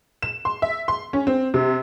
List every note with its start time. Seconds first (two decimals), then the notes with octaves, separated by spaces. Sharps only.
0.22 E7
0.45 C6
0.62 E5
0.88 C6
1.13 C#4
1.27 C4
1.54 C3